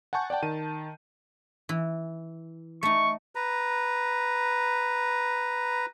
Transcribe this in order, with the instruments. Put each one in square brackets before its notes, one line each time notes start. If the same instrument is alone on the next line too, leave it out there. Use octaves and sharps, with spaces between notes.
[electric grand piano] F#5 G#5 A5 C#6 G6
D5 F#5 G5 A5
D#3 A5 D#7
[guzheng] E3
[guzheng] A3 D#4 [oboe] C#6
[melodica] B4 A#5